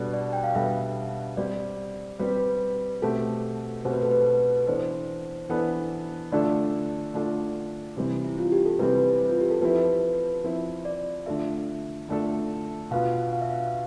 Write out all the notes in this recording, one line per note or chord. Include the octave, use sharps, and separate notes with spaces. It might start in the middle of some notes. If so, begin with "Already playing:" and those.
Already playing: B2 G3 B3 D4 A4
D5
G5
F5
B2 G3 B3 D4 A4 E5
G3 C4 G4 D5
G3 C4 G4 B4
B2 A3 C4 G4 A4
B2 A3 C4 G4 C5
B4
A4
B4
E3 B3 D4 A4 C5
E3 B3 D4 A4
D3 A3 D4 F4 A4 D5
D3 A3 D4 F4 A4
C3 E3 G3 C4
E4
F4
G4
A4
C3 E3 G3 C4 B4
F4
G4
A4
F3 C4 E4 B4
F3 C4 E4
D5
D3 A3 D4 F4 A4 E5
D3 A3 D4 F4 A4
B2 B3 F4 F5
F5
E5
F5